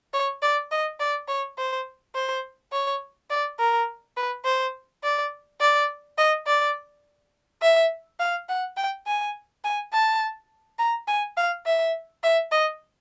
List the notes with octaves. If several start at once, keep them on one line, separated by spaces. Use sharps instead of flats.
C#5
D5
D#5
D5
C#5
C5
C5
C#5
D5
A#4
B4
C5
D5
D5
D#5
D5
E5
F5
F#5
G5
G#5
G#5
A5
A#5
G#5
F5
E5
E5
D#5